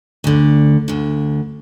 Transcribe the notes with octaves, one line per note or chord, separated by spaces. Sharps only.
D2 D3
D2 D3